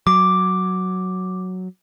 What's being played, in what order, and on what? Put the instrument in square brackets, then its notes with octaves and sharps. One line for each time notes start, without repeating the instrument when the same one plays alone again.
[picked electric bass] F#3 [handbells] D6